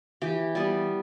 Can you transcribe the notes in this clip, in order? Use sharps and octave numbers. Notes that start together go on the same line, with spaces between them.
E3 G4
G3 B3